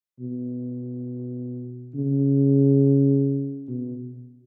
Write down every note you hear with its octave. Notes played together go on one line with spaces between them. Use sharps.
B2
C#3
B2